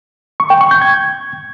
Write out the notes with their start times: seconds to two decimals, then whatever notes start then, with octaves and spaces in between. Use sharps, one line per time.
0.40 C#6
0.50 G5
0.61 C#6
0.71 G6
0.82 G#6